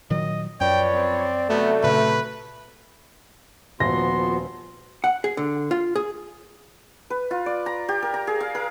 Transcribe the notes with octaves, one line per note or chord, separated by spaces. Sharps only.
A#2 D#3 F#3 D#5
F#2 F3 B4 C#5 D5 G5
C4
C3 F#3 A3 B3
A#2 C#3 B4
D#1 F3 B3 F#4 C6 A#6
F#5
G#4
D3
F4
G#4
B4
F4
D5
A#5
G4
A#4
A#5
G#4
F5
A#4